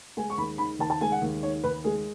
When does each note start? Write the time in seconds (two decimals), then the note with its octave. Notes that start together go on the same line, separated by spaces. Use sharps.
0.17 G#3 G#5
0.30 C#6
0.38 D#2 B5
0.58 D#3 B5
0.79 D#2 A5
0.90 A5
1.01 G#3 G#5
1.12 F#5
1.22 D#2
1.43 D#3 C#5
1.64 D#2 B4
1.84 G#3 G#4